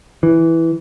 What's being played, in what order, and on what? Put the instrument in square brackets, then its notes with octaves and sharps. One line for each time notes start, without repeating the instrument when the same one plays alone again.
[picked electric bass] E3